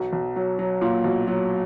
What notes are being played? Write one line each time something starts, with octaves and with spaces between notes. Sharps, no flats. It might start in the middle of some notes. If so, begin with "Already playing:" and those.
Already playing: B1
B1
F#3
F#3
A#2
B1
F#3